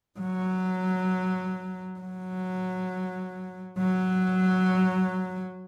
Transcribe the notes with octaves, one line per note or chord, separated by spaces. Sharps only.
F#3
F#3
F#3